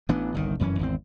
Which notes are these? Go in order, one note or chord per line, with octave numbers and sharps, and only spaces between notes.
A1 E3 B3 D4
G1 C2 C3 D#3
F1 F#2 E3 C#4
G#1 E2 C4